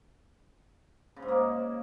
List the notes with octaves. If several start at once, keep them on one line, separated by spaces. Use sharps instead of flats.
C#3
G#2
A#3